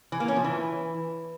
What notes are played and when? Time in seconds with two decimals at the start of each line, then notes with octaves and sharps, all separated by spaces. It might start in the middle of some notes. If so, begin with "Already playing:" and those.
0.12 E3
0.20 A#3
0.28 C#4
0.36 F3
0.44 E3